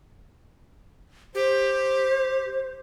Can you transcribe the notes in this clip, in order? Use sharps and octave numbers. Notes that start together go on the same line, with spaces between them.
G4 C5